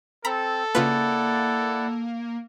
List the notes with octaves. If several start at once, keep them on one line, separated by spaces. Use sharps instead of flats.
C4 A4 A#5 B5
C#3 A#3 E4 F4 B4 D5 F#5